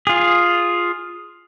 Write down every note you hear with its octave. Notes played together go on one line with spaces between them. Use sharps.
F4 G#4